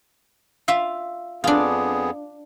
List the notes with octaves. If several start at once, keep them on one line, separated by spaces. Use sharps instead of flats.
F4 E5 F5
F2 B3 D4 F4 G#4